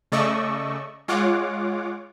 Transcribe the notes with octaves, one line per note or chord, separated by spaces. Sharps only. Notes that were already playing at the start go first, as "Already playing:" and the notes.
C#3 A3 D5 D#5 C#6 E6
G#3 F4 C#5 F#5 D6